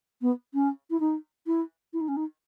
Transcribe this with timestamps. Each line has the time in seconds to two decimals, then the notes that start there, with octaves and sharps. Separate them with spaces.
0.21 B3
0.54 C#4
0.90 E4
1.00 D#4
1.46 E4
1.93 E4
2.00 D#4
2.08 C#4
2.16 D#4